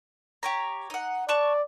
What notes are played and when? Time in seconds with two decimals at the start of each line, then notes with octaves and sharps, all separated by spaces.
0.43 G4 C#5 A#5
0.90 D#4 F#5
1.29 D5 A5 C#6 F#6